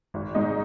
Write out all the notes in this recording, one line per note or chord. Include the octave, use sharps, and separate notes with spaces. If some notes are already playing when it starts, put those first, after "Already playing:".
G#1
G#2 G#3 D#4